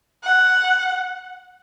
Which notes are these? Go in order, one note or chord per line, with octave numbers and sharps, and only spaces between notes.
F#5